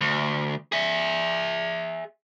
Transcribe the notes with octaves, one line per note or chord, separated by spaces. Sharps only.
D2
G#4 E5